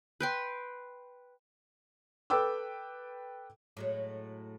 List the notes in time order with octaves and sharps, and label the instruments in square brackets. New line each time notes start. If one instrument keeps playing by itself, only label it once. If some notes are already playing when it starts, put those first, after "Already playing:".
[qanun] B4 G5 C6
[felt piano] A4 B4 G5 D6 E6
[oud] A2 F#3 G#3